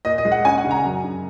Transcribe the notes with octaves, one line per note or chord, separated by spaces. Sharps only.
A#2 D#5
D#5
G#3
F#5
C#4 G#5
F#5
C#3
A#5
F#2
C#3